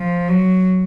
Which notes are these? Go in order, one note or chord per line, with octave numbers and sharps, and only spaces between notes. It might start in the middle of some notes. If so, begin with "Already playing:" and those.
Already playing: F3
F#3